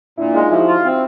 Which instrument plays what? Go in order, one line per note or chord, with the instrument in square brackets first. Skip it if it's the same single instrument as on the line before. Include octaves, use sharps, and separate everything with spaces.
[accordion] A#2 [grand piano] D4 E4
[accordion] G#3 [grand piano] D#4 F4
[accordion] F3 [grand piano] E4 F#4
[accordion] F4
C4